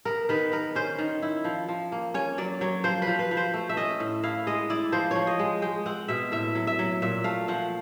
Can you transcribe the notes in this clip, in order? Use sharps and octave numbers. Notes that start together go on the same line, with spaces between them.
B3 A#4
D#3 B4
B3 A#4
C#4 C5
D#3
E4
F3
F3
A#3
C#4 C#5
F#3 D5
F#3 C#5
F3 C5
B4
F3
B4
F3
C5
A3
E5
C#4 D#5
A2
E4 F5
G#3 D#5
E4 D5
F3 C5
F3 C#5
D#5
G#3
G#3 G5
C4 F#5
B2 E5
A2 E5
F#3
E5
F#3
A#2 E5
A3 F5
F3 F#5